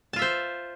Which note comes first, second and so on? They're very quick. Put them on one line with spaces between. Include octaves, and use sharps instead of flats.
A5 F4 E5 C5